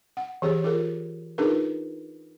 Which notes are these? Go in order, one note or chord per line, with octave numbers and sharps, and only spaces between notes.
F#5
E3 G4 G#4 C#5
F4 G#4 A#4
D4 D#4 F4 G#4 A#4 B4